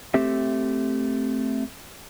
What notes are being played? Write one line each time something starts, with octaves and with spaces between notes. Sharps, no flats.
A3 C4 G4 E5